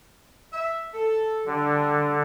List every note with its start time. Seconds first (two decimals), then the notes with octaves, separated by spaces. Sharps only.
0.53 E5
0.94 A4
1.46 D3 G3 D4